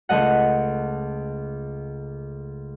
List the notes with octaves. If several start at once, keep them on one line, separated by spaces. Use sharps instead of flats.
C#2 A3 D#5 F#5